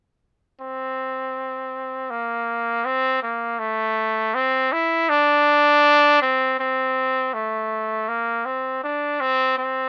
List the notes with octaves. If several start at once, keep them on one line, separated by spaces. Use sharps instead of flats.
C4
A#3
C4
A#3
A3
C4
E4
D4
C4
C4
A3
A#3
C4
D4
C4
C4